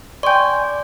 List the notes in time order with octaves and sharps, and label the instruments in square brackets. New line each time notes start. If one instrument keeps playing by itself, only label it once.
[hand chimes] D5 G#5 [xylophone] G5 C6 [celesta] C#6 G6